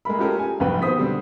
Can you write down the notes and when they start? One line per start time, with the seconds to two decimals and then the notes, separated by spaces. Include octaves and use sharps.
0.05 G#3 A3 A#4 B5
0.19 G#3 C#4 F4 G4 A4 A#4
0.39 G#5
0.60 F#1 C2 F2 G#2 B4 G5
0.82 B2 D#3 C5 D#6 B6
0.98 D3 G3 C4